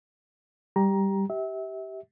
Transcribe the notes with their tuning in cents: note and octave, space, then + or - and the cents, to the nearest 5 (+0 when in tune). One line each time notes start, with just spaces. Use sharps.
G3 +0 G4 +0 A#5 +15
G4 -15 E5 -30